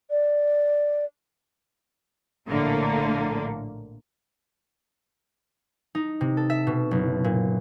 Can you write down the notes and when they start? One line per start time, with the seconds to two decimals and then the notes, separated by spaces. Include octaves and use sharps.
0.11 D5
2.47 A#1 A2 D3 A#3
5.95 D#4
6.21 C3
6.37 A4
6.50 E5
6.67 B2
6.91 F#1
7.24 A#2